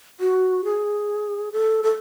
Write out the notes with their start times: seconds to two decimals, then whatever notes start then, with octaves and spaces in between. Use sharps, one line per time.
0.20 F#4
0.65 G#4
1.52 A4
1.83 A4